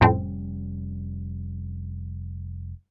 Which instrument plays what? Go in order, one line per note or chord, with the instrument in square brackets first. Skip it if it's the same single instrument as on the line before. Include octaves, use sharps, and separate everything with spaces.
[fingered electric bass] F1 G3 C#4 [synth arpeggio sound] F2 A2 C4